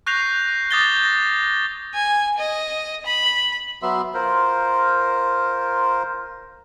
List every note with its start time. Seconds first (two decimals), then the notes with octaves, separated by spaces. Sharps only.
0.06 C#6 F#6 G6 A#6 C7 F7
0.71 D6 D#6 G6 A6 A#6 G7
1.03 A#6
1.94 G#5
2.38 D#5
3.06 B5
3.82 F#3 B3 E5 C6
4.14 F4 A#4 C5